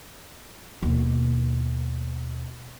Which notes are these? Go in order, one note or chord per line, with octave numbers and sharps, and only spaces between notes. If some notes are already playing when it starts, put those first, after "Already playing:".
D#2 B2